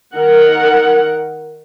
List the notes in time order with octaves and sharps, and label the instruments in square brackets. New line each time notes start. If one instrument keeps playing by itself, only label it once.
[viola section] D#3 A#4 F#5